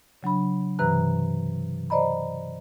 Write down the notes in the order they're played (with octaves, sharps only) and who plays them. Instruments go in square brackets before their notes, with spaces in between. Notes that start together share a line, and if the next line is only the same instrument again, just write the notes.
[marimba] C#3 F#3 D4 B5
G2 C3 E3 B4 A#5 F#6
C5 D5 D#5 A#5 B5